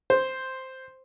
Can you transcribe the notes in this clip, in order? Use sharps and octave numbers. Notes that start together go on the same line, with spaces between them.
C5